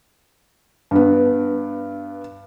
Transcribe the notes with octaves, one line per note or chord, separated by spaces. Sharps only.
G2 B3